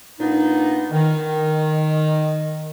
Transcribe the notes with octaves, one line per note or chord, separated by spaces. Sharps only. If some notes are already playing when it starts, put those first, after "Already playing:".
A#2 B3 D4 D#4
D#3